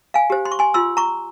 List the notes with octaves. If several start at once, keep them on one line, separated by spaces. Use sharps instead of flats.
F5 G#5
G4 C5
C6
C#6
G#5 C6
F4 C6 E6
A#5 C#6